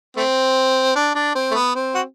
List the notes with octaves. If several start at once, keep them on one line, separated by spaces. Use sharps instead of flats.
A3 C4
D4
D4
C4
A3
B3
C4
F#4